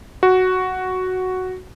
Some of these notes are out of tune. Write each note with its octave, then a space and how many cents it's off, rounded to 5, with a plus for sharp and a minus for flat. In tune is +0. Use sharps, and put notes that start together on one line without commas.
F#4 +0